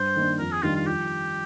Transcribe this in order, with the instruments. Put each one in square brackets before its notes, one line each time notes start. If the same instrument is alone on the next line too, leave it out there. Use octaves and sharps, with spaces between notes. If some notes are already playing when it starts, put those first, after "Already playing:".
Already playing: [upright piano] G2 [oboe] C5
[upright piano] D#3 A#3 D4
[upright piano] F2 [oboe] A#4
[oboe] G#4
[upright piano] D#3 G3 D4 [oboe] F4
[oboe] F4
[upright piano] F3 [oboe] G4